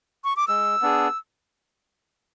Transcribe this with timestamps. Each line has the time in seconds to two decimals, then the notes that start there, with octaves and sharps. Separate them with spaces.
0.24 C#6
0.36 D6
0.48 G#3 E6
0.82 B3 D4 G#4